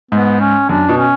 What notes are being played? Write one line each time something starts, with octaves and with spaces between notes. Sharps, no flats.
G#2 B3
C#4
F#2 D4
B2
C#4